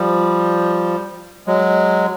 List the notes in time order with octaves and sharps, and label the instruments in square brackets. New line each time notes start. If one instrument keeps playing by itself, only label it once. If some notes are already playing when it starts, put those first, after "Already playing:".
Already playing: [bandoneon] F3 G3
F#3 G#3